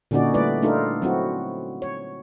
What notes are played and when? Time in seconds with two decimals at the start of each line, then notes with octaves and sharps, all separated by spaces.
0.11 A#2 D3 C#4 D#4 F#4 D5
0.34 G3 A3 E4 B4 D5
0.62 A3 D4 D#4 F4 A4 A#4
1.02 F#3 C4 E4 F#4
1.82 C#5